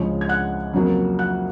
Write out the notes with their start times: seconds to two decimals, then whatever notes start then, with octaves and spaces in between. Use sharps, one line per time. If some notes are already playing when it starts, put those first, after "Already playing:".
Already playing: C#2 C#3 F3 G#3 C#5
0.21 G#6
0.29 F#5 F#6
0.73 F2 C#3 F#3 A#3
1.19 F#5 F#6